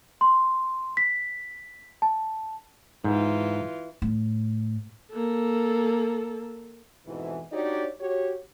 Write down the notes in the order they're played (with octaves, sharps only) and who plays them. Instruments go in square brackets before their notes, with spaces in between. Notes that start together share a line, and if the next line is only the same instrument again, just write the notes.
[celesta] C6
B6
A5
[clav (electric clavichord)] G#2 [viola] E3 F4
[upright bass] A2
[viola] A#3 A4
[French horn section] F2 G#2 B2 E3
D4 D#4 F#4 G4 C#5 D5
F#4 G4 C#5